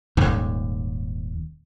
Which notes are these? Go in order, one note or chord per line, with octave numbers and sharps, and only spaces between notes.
D#1 D#2 G#2